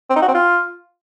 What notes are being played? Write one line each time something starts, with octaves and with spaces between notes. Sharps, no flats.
C4
D#4
F#4
C4
F4